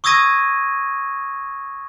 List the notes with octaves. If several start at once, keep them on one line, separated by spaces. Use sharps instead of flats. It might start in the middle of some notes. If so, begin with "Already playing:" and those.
C#6 D#6 E6 G#6 A#6 D#7